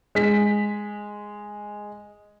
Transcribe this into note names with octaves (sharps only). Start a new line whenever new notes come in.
G#3 B6